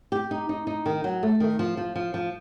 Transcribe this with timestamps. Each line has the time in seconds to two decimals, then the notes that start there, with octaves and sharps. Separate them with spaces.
0.12 G4
0.31 D#4
0.49 D#4
0.67 D#4
0.86 D#3
1.04 F#3
1.23 A3
1.40 D#3
1.59 F3
1.77 F3
1.96 F3
2.14 F3